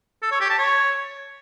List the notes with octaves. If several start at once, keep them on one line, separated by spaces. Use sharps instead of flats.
A4
C#5
G4
A5
C#5